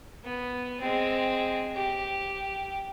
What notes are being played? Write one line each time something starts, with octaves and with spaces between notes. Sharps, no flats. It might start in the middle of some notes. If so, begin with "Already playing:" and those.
B3
G#3 C4
G4